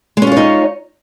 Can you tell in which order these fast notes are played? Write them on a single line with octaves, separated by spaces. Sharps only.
G#3 C#4 F4 C#5 D#4